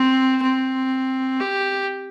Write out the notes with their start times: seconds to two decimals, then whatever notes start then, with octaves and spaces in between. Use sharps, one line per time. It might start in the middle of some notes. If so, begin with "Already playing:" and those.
Already playing: C4
0.42 C4
1.40 G4